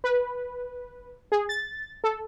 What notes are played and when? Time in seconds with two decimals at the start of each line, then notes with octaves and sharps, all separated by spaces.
0.04 B4
1.32 G#4
1.49 A6
2.04 A4